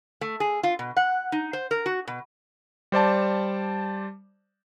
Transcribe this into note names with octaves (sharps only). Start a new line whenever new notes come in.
A3
G#4
F4
B2
F#5
D#4
C5
A#4
F#4
B2
G3 C5 D5 A5